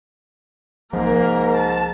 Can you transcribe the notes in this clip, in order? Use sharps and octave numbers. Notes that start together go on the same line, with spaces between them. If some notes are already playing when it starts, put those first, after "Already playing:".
C2 G#2 F3 A#3 A#4
A5